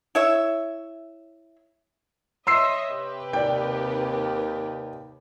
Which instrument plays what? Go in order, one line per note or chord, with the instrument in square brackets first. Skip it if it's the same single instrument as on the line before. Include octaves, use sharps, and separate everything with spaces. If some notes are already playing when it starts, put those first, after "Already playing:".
[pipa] E4 C#5 E5
[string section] C#5 D#5 E5 [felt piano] C6 E6 C7
[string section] C3 G4 B4
[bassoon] D#2 [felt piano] D5 G5